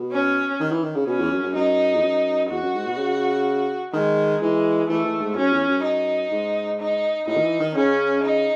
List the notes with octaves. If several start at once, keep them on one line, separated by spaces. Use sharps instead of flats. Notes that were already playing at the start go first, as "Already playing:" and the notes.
Already playing: B2
C#4
D#3
E3
D#3
C#3
B2 C#4
E2
F#2
F#2
F#2 D#4
E2
F#2
E2 F#4
F#2
G#2
B2
C#3
D#3 G#3
E3 G#3
E3 A3
E3
G#2
F#2 C#4
E2
F#2
D#4
G#2
D#4
A2 D#4
D#3
E3
D#3
C#3 C#4
D#4